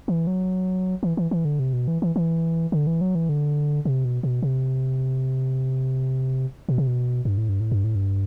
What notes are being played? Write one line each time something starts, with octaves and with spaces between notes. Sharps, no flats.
E3
F#3
E3
E3
E3
D3
C3
B2
E3
E3
E3
D3
E3
F#3
E3
D3
C3
B2
B2
C3
B2
C3
B2
G2
A2
G2
A2
G2
A2
G2